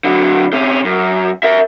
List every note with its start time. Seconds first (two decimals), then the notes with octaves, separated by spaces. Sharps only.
0.04 D3 F#3
0.53 C3 C#4
0.85 F#2
1.43 A#4 E5